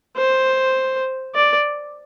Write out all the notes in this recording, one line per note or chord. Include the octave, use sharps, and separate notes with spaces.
C5
D5